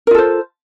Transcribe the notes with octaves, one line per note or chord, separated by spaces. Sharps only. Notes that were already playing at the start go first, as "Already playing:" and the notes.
F4 A4 A#4 C5